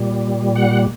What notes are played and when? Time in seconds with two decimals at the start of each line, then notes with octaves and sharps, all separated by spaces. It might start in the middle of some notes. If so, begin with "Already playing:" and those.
Already playing: A#2 G3
0.56 F#5